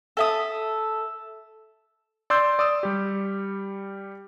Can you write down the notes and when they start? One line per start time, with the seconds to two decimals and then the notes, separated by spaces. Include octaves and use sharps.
0.17 A4 E5 D#6
2.30 D5 C6 E6 G6
2.59 D5 D#6 E6
2.83 G3 G4